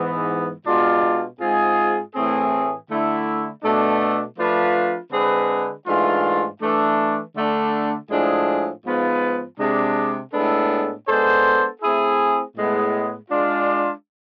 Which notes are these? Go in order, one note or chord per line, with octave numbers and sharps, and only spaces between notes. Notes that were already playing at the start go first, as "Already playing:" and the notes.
Already playing: G#2 E3 B3
B2 G#3 D4 F4
G#2 G#3 C4 F4 G#4
A2 E3 A3 C4 G#4
D3 A3 E4
B2 A3 D4
F3 A3 D4 F4 B4
D3 G#3 C4 G#4 B4
G#2 E3 A3 D4 F4
E3 A3 D4
D3 A3 D4
A2 F3 G#3 D4 G#4
G#2 F3 B3 F4 B4
C3 G#3 D4
A2 G#3 B3 D4 A4
G#3 B3 D4 A4 C5
A3 C4 E4 G#4
A2 G#3 B3
G#3 D4 F4